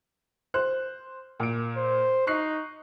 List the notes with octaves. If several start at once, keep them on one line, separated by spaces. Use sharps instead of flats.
C5 F#6
A#2 D7
C5
D#4 C#6 F#6 C7